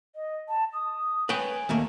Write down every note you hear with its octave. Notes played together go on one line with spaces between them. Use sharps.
D#5
A5
D#6
B4 C#5 G5 G#5
D#2 A3 A#3